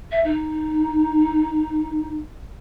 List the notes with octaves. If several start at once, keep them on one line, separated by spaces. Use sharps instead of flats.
E5
D#4